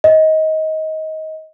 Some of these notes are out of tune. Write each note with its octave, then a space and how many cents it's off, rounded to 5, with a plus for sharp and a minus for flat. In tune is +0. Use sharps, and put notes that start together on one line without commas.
D#5 +20